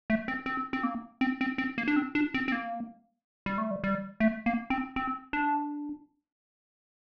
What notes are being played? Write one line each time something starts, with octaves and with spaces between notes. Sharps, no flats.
A3
C4
C4
C4
A#3
C4
C4
C4
A#3
D4
C4
D4
C4
C4
A#3
G3
A3
G3
G3
A3
A#3
C4
C4
D4